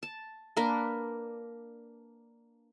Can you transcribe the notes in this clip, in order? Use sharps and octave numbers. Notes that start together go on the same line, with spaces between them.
A5
A#3 D4 A#4 B4